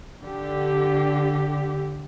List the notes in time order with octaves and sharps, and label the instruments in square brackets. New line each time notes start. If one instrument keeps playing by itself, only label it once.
[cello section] D3 G4